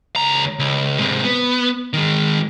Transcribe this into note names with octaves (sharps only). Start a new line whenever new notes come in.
C#2 A#5
C#2
G#2 C3
B3
D#3 G#3